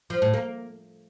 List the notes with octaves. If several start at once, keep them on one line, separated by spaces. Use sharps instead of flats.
F3
A2
A#3